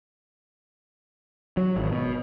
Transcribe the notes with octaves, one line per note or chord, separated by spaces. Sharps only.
F#3
G#1
B2